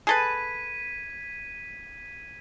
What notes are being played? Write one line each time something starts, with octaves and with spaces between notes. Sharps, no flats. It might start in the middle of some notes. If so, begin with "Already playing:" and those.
G#4 A4 B4 G#6 B6 D#7